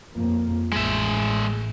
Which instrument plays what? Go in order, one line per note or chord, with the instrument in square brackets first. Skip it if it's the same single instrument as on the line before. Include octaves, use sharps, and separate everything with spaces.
[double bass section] F2 F3 A#3
[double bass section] A1 [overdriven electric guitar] G#3 E5